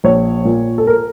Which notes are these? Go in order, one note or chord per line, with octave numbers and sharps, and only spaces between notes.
A#1 C#5
A#2
A4
A#4